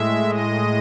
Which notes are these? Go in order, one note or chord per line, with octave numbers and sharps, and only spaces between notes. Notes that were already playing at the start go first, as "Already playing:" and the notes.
Already playing: A2 G#3 E5
D#5